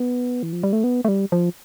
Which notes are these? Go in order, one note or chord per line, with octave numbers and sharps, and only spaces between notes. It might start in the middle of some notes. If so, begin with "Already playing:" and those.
Already playing: B3
E3
F3
G3
A3
B3
A3
G3
F3